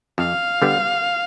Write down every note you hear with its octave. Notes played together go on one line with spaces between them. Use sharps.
F2 F5
D3 G3 B3